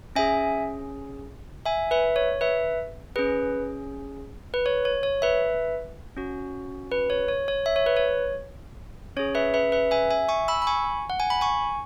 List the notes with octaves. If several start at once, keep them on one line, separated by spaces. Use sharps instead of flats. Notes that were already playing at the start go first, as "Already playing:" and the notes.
C#4 G#4 E5 G#5
E5 G#5
B4 E5
C#5
B4 E5
C#4 G#4 B4
B4
C#5
C#5
C#5
B4 E5
C#4 F#4
B4
C#5
C#5
C#5
E5
C#5
B4
C#5
C#4 G#4 C#5
B4 E5
B4 E5
B4 E5
E5 G#5
E5 G#5
G#5 C#6
B5 E6
B5
G#5 C#6
F#5
G#5
B5
G#5 C#6